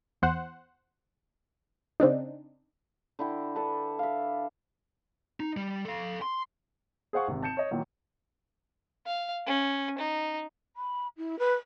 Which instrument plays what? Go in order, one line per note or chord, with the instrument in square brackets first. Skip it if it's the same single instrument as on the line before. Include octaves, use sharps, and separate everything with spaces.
[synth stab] E2 C5 F#5
C#3 C4 D4 D#4
[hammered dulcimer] D3 E4 G5
D4 A4 B4
E5 F5
[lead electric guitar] D#4
G3
A4 F5
C6
[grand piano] G#4 C5 F5 F#5 C#6
G#1 C3
A5 G6 C#7 E7
C#5 D#5
A#2 D#3 E3 F#3
[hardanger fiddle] F5
C#4
D#4
[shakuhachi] B5
E4
B4